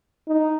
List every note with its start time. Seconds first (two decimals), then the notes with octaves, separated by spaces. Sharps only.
0.28 D#4